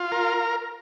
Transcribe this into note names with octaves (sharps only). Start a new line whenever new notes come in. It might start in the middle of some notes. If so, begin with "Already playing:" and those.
Already playing: F4
A#4